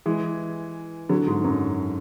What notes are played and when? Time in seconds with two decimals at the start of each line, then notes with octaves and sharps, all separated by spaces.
0.06 E3 G#3
1.09 D3 F#3
1.27 G#2
1.44 F#2